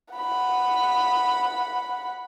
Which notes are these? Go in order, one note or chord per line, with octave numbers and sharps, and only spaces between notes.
F#5 B5